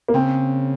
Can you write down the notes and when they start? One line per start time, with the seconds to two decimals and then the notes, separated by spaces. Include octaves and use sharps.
0.08 A#3
0.14 C#3 C4